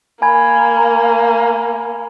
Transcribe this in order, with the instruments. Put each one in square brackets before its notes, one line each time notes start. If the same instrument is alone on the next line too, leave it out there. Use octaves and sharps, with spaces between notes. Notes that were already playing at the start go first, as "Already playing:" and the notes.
[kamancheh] A#3 [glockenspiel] G#5 B5 G#6